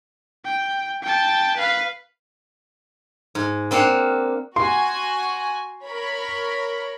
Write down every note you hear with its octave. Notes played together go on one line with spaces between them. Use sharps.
G5
G5 A5
B4 F5
G#2
A#3 C4 D4 F5 F#5
F#4 G#5 C6
A#4 C#5 B5